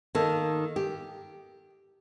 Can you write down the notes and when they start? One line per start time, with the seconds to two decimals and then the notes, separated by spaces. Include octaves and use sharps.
0.15 D#3 A#3 A4
0.76 G4